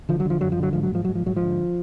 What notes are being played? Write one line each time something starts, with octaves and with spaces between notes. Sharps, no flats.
D3 F3
F#3
D3 F3
F#2 F#3
F3
D3 F#3
G#2 F3
F#3
G#2 F3
G#2 F#3
F3
G#2 F#3
F3
D3